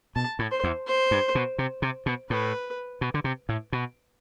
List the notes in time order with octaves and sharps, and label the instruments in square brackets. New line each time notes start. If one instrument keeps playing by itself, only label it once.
[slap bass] B2 [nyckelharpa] A5
[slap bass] A2
[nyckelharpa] C5
[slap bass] E2
[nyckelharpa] C5
[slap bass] G2
B2
C3
C3
B2
[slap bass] A2 [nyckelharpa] B4
[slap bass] B2
D3
C3
A2
B2